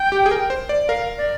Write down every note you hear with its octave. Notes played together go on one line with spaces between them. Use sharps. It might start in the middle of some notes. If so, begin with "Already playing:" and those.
Already playing: G5
G4
G#4
A#4
C5
D5
A#4 F5
D5